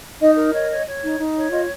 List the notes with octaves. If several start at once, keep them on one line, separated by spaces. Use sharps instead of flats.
D#4 D#5
A#4
C#5 D#5
C#5
C#5
D#4
D#4
C#5
F4 D#5